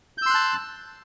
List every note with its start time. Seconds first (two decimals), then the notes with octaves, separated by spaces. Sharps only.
0.18 G6
0.22 E6
0.26 C6
0.30 F#6
0.35 A5